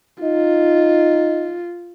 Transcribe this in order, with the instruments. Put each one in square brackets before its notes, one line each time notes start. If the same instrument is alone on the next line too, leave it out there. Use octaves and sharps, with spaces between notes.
[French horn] D#4 [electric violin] F4